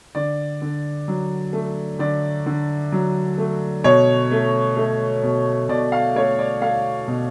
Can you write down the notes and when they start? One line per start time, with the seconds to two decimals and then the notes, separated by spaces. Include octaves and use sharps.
0.15 D3 D5
0.62 D3
1.08 F#3
1.53 A3
1.99 D3 D5
2.46 D3
2.92 F#3
3.38 A3
3.84 B2 C#5
4.31 A3
4.77 A3
5.23 B2
5.69 B2 D5
5.92 F5
6.16 A3 C#5
6.39 D5
6.62 A3 F5
7.08 B2